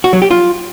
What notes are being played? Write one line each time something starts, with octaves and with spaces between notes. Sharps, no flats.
F#4
F#3
G4
F4